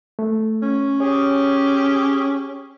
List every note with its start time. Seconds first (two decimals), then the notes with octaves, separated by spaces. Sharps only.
0.19 A3
0.63 C#4
1.00 G4 G#4 C#5